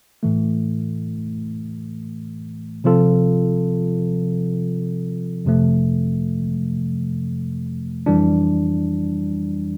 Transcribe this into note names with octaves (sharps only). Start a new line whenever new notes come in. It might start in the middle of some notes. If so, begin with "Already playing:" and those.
A2 E3 A3
C3 F3 C4 F4 A4
F2 C3 F3 A3
F2 E3 G3 D4